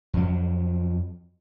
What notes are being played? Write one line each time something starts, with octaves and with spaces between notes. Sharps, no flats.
F2 F#3